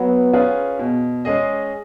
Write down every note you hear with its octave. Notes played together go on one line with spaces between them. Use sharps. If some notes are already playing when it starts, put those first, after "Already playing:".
Already playing: F#3 B3
C#4 F4 G#4 B4
B2
G#3 C#4 G#4 D#5